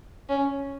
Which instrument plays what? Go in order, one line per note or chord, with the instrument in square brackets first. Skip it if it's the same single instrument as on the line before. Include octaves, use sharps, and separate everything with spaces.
[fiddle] C#4